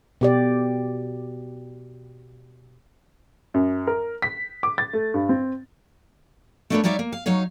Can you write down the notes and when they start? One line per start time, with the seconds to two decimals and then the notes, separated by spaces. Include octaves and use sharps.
0.21 B2 G4 D5
3.54 F#2
3.87 A#4
4.22 B6
4.63 D6
4.78 A6
4.93 A3
5.14 G2
5.29 C4
6.70 A3 A#3 D4 A#4 B4 C#5
6.84 G3 D#4 C#5 D5 E5 F5
6.99 A#3
7.12 F5
7.26 F#3 D#4 C#5 F5